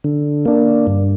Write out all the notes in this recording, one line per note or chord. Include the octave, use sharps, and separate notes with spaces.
D3
A#3 D4
G2